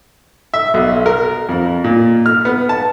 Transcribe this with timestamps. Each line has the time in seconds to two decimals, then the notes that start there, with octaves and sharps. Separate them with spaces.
0.54 E5
0.74 B1
1.06 A#4
1.49 F2
1.84 A#2
2.26 F6
2.45 B3
2.69 A5